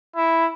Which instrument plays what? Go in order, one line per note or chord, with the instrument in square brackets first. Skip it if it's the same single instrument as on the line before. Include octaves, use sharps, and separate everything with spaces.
[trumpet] E4